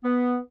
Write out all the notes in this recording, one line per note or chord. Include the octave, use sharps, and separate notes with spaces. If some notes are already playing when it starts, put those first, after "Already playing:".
B3